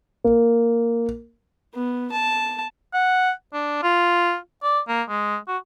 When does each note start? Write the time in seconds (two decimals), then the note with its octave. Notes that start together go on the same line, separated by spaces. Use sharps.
0.24 A#3
1.74 B3
2.12 A5
2.94 F#5
3.53 D4
3.83 F4
4.63 D5
4.88 A#3
5.09 G#3
5.47 F#4